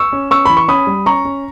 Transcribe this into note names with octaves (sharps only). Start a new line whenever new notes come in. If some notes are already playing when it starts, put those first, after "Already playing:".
Already playing: C#6 E6
C#4
C#4 C#6 E6
E3 B5
C#6
C#4 B5 D#6
G3
C#4 A#5 C#6
C#4